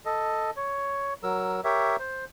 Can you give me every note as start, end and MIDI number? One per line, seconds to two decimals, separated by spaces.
0.05 0.51 69
0.05 0.51 75
0.56 1.14 73
1.23 1.61 54
1.23 1.61 70
1.23 1.61 88
1.64 1.96 67
1.64 1.96 70
1.64 1.96 73
1.64 1.96 76
1.99 2.25 72